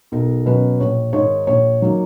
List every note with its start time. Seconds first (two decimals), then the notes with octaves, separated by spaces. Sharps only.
0.12 B1 A#4
0.46 B2 F#3 C#4 B4
0.80 A#1 C#5
1.13 G#2 D#3 C#5
1.47 A#1 C#5
1.82 F#3 A#3 D#4